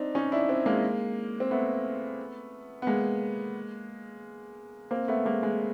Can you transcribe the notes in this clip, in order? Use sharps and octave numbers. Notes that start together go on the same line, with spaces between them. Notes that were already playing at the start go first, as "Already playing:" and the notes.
Already playing: C4 D4 D#4
C#4 D#4
D4 E4
C4 D4
G#3 A#3
C4
A3 B3
B3
G#3 A#3
A#3 C4
A3 B3
G#3 A#3
G#3